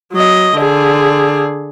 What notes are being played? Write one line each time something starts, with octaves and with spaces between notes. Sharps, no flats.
F#3 D#5
D3 G#4